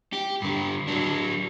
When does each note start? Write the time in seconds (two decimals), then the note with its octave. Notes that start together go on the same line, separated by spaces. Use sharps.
0.13 G4
0.42 G2 D3
0.87 F#3 D4